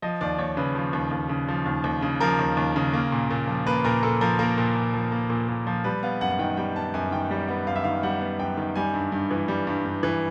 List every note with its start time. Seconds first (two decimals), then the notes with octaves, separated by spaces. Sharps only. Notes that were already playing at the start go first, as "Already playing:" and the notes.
0.02 F3 D#5
0.21 D#2 D5
0.38 D#2 C#5
0.57 C#3 B4
0.75 F3
0.93 D#2
1.11 D#2
1.29 C#3
1.48 F3
1.66 D#2
1.84 D#2
2.02 C#3
2.20 F3 A#4
2.39 D#2
2.57 D#2
2.76 C#3
2.94 A#3
3.12 A#2
3.30 A#2
3.47 F3
3.66 A#3 B4
3.85 A#2 A#4
4.03 A#2 A4
4.21 F3 A#4
4.39 A#3 A#4
4.58 A#2
4.76 A#2
4.94 F3
5.12 A#3
5.30 A#2
5.48 A#2
5.67 F3
5.84 G3 B4
6.03 B3 F5
6.21 F#2 F#5
6.31 F#5
6.39 D#3 G5
6.57 G3 G5
6.76 B3 A5
6.94 F#2 G#5
7.11 D#3 G5
7.31 G3
7.48 B3
7.67 F#2 F5
7.76 E5
7.84 D#3 F5
8.03 G3 F#5
8.21 B3
8.39 F#2 G5
8.57 D#3
8.76 G3 G#5
8.94 G2
9.12 G2
9.31 E3
9.48 G3
9.67 G2
9.85 G2
10.03 E3